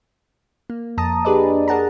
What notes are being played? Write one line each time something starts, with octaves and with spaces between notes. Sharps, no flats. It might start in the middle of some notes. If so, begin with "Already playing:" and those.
A#3
F2 A5 A#5 D#6
D4 G4 G#4 B4 D5 D#5
G#4 A#4 F#5 A5 A#5